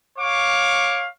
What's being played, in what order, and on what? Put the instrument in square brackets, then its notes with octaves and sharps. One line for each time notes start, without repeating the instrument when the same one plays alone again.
[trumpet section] C#5 F5 C#6 D6